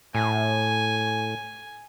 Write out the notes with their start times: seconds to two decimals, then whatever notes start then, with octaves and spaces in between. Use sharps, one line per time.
0.15 A2 G#5